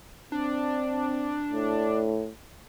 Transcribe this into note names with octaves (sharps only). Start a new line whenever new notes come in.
C4 D4
A2